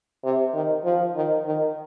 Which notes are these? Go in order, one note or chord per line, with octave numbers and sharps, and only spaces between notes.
C3
D#3
F3
D#3
D#3